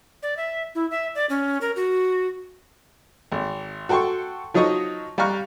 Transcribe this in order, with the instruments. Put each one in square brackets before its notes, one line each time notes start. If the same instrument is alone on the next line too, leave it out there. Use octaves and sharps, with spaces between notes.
[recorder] D5
E5
E4
E5
D5
C#4
A#4
F#4
[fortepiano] G#1
F#4 A4 G5 C6 C#6
F3 F#3 D#4 D#5 C#6 D#6
G3 F5 A#5 C#6 F6 F#6